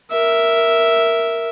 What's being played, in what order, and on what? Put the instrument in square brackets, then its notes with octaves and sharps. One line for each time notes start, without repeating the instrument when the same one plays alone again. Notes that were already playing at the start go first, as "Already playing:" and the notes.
[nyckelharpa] A#4 E5